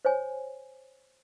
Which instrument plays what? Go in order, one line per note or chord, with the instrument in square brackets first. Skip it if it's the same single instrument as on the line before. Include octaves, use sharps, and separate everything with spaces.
[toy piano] C5 C#5 G#5